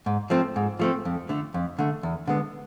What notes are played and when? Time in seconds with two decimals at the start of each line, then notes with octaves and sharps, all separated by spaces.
0.06 G#2
0.30 F3 A3 C4
0.56 G#2
0.79 F3 A3 C4
1.05 F2
1.29 D3 A3
1.54 F2
1.79 D3 A3
2.03 E2
2.27 D3 G#3 B3